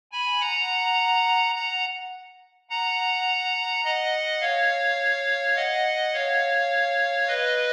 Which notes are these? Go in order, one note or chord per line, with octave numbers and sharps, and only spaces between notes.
G#5 B5
F#5 A#5
F#5 A#5
F#5 A#5
D#5 F#5
C#5 F5
D#5 F#5
C#5 F5
B4 D#5